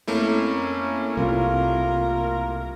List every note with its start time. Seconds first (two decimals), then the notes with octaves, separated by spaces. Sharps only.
0.07 F2 A3 A#3 C#4 E4
1.17 C2 F4 A#4